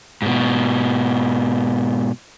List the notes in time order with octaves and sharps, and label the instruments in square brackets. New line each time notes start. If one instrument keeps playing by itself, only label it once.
[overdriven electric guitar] G#2 B2